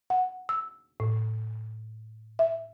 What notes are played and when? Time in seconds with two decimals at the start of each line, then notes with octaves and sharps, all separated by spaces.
0.10 F#5
0.49 E6
1.00 A2
2.39 E5